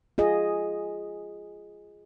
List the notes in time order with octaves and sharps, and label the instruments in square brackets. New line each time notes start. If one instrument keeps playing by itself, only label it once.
[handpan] F4 G#4 D#5